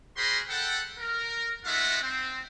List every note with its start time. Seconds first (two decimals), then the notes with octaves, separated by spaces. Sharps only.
0.17 F#4 G#4 A#4 C5 B5 C6
0.48 A4 F#5 G5
0.98 A#4
1.65 G#3 A3 D#4 F4 E5 F#5
2.02 C4